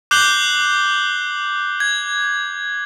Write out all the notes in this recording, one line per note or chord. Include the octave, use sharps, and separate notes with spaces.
D6 F#6 G6 C7 F#7 G7
G#6